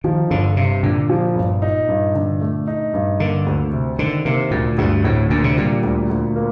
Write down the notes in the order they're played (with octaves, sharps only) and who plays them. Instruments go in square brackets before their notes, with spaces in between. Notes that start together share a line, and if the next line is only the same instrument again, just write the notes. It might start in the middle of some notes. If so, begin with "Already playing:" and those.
[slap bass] D#3 [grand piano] F3
[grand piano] G1 [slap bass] D3
[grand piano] G2 [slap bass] C3
[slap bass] A#2 [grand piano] D3
[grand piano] F3
G1
D#4
G2
D3
A3
D#4
G2
[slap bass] D3 [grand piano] A#3
[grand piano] D2
C3
[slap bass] D3 [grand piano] D#3
[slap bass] C3 [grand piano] A#3
[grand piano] D2 [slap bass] A#2
[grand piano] D2 [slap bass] G2
[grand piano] D2 [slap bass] A2
[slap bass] A#2 [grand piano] D3
[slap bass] C3
[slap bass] A#2 [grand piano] G3
[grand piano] D2
D2
A#3